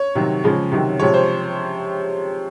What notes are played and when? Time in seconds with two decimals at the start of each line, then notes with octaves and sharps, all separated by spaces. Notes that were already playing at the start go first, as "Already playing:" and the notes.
Already playing: C#5
0.15 C3 D#3 F#3
0.44 C#3 F3 G#3
0.72 C3 D#3 F#3
1.00 C3 F3 G#3 C#5
1.14 C5